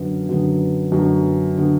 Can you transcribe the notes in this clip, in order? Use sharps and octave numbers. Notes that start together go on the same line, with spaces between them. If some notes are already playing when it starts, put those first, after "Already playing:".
Already playing: F#2 D3 B3
F#2 D3 B3
F#2 D3 B3
D3 B3